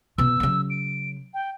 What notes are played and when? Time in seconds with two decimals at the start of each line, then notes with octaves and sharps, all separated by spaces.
0.18 B2 B3 E6
0.40 C#3 F#3
0.70 D7
1.34 G5